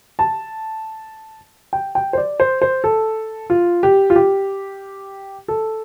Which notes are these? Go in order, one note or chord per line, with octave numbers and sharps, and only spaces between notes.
A5
G5
G5
C5
D5
C5
C5
A4
F4
G4
F4
G4
A4